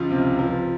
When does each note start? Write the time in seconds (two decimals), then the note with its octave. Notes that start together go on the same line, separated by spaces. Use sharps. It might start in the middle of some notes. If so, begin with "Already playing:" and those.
Already playing: C#2 C#3 F3 F4
0.11 C3
0.39 F3